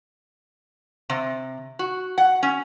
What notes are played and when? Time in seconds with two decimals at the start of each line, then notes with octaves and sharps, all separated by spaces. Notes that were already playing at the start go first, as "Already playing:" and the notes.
1.10 C3
1.79 F#4
2.18 F#5
2.43 C#4